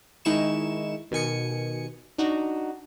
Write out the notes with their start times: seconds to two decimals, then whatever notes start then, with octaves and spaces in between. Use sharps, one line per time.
0.25 D#3 G#3 D#4 E4 C#6 E7
1.11 B2 D#3 G#5 C#7
2.18 D4 D#4 F#4